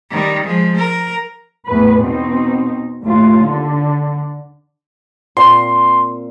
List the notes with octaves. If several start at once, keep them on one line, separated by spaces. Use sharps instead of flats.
D#3 G3
F3 G#3
A#4
E2 A2 B4
B2 C4 D#4
D#2 A2 F4
D3
A#2 C4 F5 C6